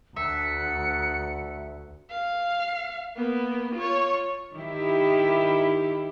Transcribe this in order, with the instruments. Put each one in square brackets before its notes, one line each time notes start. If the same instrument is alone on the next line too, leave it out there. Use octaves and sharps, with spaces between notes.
[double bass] D2 [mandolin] E5 [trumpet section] F#5 A5 A#5 [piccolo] C#7
[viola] F5
A#3 B3
F4 C#5
[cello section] D#3 E4 G4